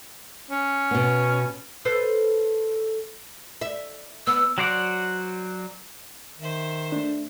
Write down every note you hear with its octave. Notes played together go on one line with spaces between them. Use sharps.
C#4
B2 B3
A4 B4 C5
E5
B3 E6
F#3 F#4 C5 D5 F#5
D#3 C5 E5
A3 D4